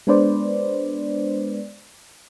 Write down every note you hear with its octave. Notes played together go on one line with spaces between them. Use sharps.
G#3 B3 D4 B4 C5 D5